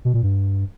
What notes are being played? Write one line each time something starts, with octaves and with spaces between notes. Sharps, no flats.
B2
A#2
G2